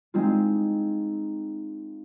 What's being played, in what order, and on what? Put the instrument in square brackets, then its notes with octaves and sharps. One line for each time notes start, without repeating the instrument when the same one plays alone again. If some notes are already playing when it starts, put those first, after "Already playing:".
[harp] G#3 C4 D#4 F4